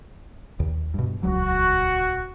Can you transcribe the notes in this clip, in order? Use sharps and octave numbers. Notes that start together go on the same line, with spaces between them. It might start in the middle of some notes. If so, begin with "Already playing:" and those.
D#2
G2 B2
D#1 C#2 F#3 F#4